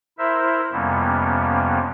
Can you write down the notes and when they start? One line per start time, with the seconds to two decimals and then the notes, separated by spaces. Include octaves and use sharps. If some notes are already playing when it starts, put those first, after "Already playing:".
0.18 E4 A#4 C5 E5
0.72 F2 C3 G3 A#3 B3 C#4